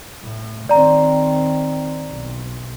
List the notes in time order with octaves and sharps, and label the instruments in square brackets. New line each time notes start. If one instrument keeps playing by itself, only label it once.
[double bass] A2
[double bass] D#3 C4 [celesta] D5 A#5
[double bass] B1